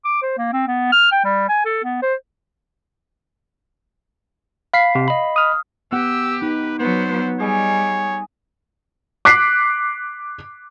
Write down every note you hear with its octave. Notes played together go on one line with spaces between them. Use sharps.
D6
C5
A#3
C4
B3
F6
G5
G3
G#5
A4
B3
C5
F5 B5 B6 C7
C3
D#5 B5
D#6 F6
B3 G4 F#5 E6
D#4 B4
F#3 B3 C5
G3 G#4 C#5 D#5 G#5
D6 F#6 B6 C7